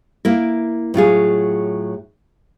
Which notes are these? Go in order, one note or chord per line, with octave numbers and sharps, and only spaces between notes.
A#3 E4 A#4
A2 F#3 F4 G#4